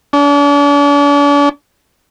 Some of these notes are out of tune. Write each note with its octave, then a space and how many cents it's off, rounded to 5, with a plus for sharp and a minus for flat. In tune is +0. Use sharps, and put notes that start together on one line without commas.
D4 -40